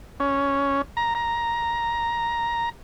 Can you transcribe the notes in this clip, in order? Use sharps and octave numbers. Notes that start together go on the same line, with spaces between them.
C#4
A#5
A#5